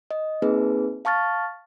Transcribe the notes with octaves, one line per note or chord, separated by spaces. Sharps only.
D#5
A#3 C4 D#4 G#4 B4
F5 A5 C#6 F6 A6